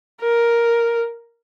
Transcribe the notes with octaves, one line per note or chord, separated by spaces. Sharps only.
A#4